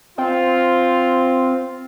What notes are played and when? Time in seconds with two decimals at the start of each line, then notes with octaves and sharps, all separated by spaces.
0.18 C4 F4